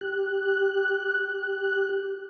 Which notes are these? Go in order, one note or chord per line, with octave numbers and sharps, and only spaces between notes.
G4 F#6